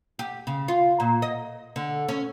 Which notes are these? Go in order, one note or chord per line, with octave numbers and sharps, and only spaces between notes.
G4
C#3
F4
A#2
D#5
D3
C#4